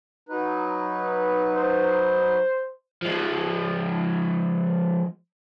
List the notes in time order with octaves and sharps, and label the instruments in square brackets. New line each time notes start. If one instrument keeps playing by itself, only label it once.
[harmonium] F#3 D#4 B4
[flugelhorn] C5
[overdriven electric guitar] F3 G#3